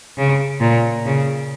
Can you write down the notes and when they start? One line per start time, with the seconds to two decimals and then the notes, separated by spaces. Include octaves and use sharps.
0.18 C#3
0.61 A#2
1.06 C#3